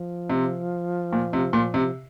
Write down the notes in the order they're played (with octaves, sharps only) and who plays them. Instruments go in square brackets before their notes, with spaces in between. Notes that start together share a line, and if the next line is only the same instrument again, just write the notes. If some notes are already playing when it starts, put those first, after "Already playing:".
Already playing: [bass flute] F3
[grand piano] C3
A#2
C3
A#2
C3